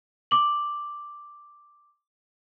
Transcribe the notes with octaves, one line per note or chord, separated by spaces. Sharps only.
D6 F#7